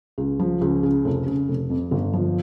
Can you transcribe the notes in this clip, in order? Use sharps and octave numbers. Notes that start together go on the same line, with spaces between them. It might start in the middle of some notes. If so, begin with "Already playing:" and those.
C#2
F3
C#2
C#3
F1
C#3
F1
F2
G1
F3